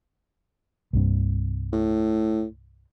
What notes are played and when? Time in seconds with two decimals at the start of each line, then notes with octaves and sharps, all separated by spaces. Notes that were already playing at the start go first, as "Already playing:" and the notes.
0.93 C2 G2 C3
1.73 A2